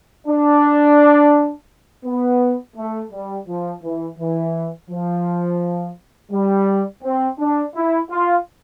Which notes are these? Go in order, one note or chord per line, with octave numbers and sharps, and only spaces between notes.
D4
B3
A3
G3
F3
E3
E3
F3
G3
C4
D4
E4
F4